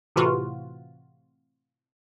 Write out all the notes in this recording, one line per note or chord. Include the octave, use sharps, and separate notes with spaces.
A2 C3 E3 F4 F#4